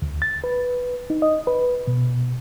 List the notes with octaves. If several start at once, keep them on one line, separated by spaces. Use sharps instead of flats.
D2
A6
B4
D#4
D#5
B4
B2